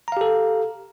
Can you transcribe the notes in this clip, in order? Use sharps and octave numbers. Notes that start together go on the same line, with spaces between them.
G4 A4 F5 A#5